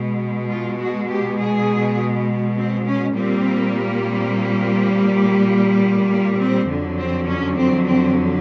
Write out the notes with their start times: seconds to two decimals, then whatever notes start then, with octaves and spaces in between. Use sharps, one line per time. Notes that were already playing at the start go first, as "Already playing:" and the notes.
Already playing: B2 G#3
0.49 F4
0.79 F#4
1.09 G4
1.38 G#4
2.56 C4
2.85 C#4
3.14 A#2 G3 A#3 C4
4.03 C4
6.09 A#3
6.38 C4
6.68 F2 D3 F#3
6.97 C4
7.27 C#4
7.56 C4
7.86 C4